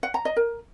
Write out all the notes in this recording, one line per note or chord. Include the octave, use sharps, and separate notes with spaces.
F#5
A#5
D#5
A#4